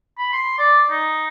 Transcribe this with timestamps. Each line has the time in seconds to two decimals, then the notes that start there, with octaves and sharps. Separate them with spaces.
0.18 B5
0.33 C6
0.58 D5
0.90 D#4